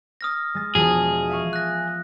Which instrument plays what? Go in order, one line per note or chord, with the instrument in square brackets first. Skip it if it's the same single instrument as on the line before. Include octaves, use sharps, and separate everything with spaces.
[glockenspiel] D#6 F6 A#6
[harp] G#3 A6
[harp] E1 F3 A5 [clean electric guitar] G#4
[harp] E5 F5 C#6
[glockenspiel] F#6 A#6